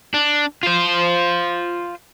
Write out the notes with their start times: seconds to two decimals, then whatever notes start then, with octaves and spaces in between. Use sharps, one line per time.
0.14 D4
0.63 F4 C5